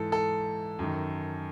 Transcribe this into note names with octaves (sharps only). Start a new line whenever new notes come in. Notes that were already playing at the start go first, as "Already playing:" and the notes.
Already playing: G#2 E3 A4
A4
F#2 D#3